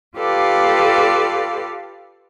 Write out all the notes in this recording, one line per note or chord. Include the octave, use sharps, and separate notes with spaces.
F4 G4 A4 B4 D5 F5